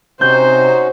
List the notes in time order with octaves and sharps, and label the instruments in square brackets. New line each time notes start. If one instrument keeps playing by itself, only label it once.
[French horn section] C3 C4 [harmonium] C#4 D#4 F#4 [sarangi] C5 [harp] G6